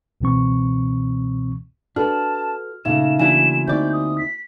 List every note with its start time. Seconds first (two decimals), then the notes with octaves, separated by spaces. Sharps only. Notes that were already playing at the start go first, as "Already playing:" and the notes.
0.21 C#2 B2 E3 C4 C#6
1.96 D4 F#4 A4 B4 A5 F6
2.85 A#2 C#3 A3 D#4 E5 F5 E7
3.20 E3 A#3 D4 E4 F#4 G#5 E7
3.68 D2 C4 D#4 E4 D5 G6
3.93 D#6
4.18 B6